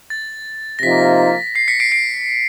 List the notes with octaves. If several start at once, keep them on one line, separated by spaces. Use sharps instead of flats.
A6
A#6
C3 F3 A#3 D#4 B6
C7
B6 C#7
C7 D7
C7 D7